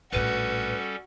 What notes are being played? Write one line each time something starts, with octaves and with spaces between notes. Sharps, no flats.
A#1 A2 G3 C#4 F#4 A4 B4